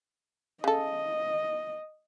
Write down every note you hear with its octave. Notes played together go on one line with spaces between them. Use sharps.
C#3 A4 D#5